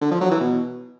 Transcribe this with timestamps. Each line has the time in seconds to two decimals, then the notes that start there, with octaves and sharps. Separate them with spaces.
0.01 D3
0.11 F3
0.21 F#3
0.31 E3
0.41 B2